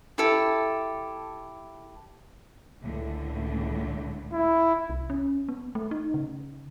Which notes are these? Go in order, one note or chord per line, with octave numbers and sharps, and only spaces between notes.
E4 G4 A4
C#2 A2 D3
E4
C2
C#4
B3
A3
D#4
C#3